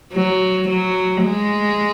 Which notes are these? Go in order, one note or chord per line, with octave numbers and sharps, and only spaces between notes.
F#3
F#3
G#3